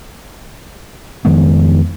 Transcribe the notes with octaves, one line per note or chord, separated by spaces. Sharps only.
F2 D#3 G#3 B3